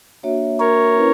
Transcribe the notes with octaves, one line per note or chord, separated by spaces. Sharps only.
A#3 D4 F#4 C#5 E5
A#4 C#5
C#4 E4 B4